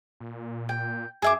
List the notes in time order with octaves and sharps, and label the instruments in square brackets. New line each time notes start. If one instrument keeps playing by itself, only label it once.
[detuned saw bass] A#2
[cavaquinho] G5
[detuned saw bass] F#2 [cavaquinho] G#4 E5 D6